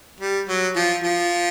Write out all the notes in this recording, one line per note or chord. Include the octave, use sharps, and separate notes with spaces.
G3
F#3
F3
F3